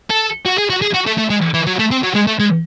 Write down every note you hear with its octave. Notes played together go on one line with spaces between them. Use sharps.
A4
F#4
G#4
F#4
G#4
F#4
A3
A3
G#3
E3
F#3
A3
C4
F#3
G#3
A3
G#3